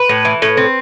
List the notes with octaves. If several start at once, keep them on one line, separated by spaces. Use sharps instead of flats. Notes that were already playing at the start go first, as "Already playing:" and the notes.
Already playing: B4
A2
E3
A2
C4